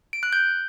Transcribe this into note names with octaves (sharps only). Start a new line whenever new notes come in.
D7
F#6
G6